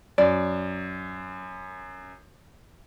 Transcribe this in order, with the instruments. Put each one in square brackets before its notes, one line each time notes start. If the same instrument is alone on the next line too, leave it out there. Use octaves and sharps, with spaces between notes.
[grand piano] F#2 [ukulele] D5